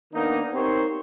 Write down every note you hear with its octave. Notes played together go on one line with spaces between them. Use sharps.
D#3 A#3 B3 D4 D#4
C4 D#4 G4 A#4 C5 C#5